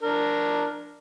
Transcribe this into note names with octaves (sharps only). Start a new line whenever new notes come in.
D4 A#4